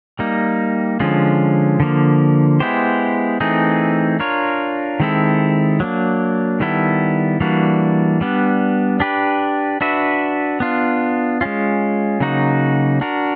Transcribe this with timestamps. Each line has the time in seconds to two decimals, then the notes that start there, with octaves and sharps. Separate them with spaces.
0.19 G3 A#3 D#4
1.00 D3 F3 G#3 C#4 F4
1.80 D3 F3 A#3
2.60 G#3 B3 E4 G4 C5
3.40 E3 A3 C4 D#4 G#4
4.20 D4 F4 A#4 C#5
5.00 D#3 G#3 C4 E4 A4
5.80 F#3 A#3 D4
6.60 D#3 G3 B3 E4 A4
7.40 E3 G3 A#3 D4 F#4
8.21 G3 B3 D4
9.00 D4 G4 B4
9.81 D4 F#4 B4 E5
10.60 B3 D4 F4
11.41 G#3 C#4 F4
12.20 C#3 F#3 A#3 D#4 F#4
13.01 D4 F#4 A#4